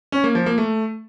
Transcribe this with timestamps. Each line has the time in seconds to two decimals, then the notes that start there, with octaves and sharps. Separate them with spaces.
0.12 C#4
0.24 A#3
0.35 F3
0.46 A#3
0.58 A3